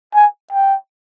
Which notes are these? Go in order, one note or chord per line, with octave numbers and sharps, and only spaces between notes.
G#5
G5